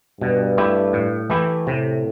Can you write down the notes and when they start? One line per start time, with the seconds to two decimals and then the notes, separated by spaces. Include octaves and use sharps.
0.21 G2 B2
0.58 A3 E4 G4
0.93 A2
1.30 E3 A3 E4 G4
1.66 A2 C3